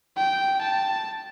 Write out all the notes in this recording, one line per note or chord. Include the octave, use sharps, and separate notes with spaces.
G5
A5